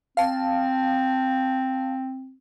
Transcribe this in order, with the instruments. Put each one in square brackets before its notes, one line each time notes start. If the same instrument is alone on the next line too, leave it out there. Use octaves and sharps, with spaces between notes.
[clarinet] C4 [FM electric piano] F5 A5